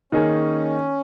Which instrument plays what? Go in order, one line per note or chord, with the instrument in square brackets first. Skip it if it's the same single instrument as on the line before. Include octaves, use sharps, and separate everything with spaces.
[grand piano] D#3 A#3 D#4 G#4 [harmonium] C#4